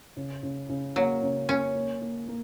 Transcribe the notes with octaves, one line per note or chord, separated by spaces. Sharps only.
C#3
C#3
C#3
F#3 A#3
C#3
A#3 C#4
A#3
A#3
A#3